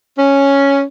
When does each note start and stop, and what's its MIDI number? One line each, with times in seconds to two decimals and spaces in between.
0.18 0.82 61